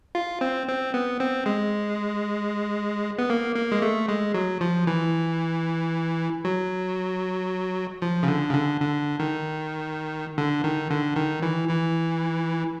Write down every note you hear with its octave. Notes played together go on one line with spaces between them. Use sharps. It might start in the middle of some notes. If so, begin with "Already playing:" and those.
F4
C4
C4
B3
C4
G#3
B3
A#3
A#3
G#3
A3
G#3
F#3
F3
E3
F#3
F3
C#3
D3
C#3
D3
D3
D#3
D3
D#3
D3
D#3
E3
E3